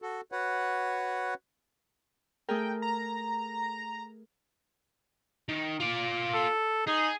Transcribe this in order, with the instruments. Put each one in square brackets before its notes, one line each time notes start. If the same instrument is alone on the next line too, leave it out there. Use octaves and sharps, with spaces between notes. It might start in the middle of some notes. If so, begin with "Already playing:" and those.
[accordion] F#4 A4
F#4 B4 C#5 F#5
[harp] A3 G#4 A#4 [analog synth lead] G5
[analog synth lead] A#5
[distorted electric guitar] D#3
F4 D5
[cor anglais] A4
[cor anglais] D#4 [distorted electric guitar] G#4